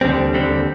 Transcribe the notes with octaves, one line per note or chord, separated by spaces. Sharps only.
D#2 D3 G3 C4
D#2 D3 G3 C4